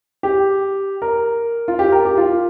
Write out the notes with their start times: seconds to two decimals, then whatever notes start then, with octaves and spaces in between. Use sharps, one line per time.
0.23 G4
1.02 A#4
1.68 F4
1.79 G4
1.92 A#4
2.05 G4
2.17 F4